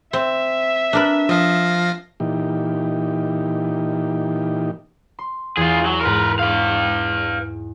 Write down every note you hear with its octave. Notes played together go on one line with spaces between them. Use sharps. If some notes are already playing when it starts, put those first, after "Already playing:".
C4 E5
D4 A#4 B4
F3 D#5 F5 A#6
A#2 E3 D#4 G4
C6
E2 F4 G#4
F#3
G#2 A#4 B4 C6
B4 F5 C#6